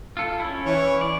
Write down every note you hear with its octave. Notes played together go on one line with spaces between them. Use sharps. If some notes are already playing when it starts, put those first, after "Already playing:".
F4 A4
C#4 E4
E3 C#5
D5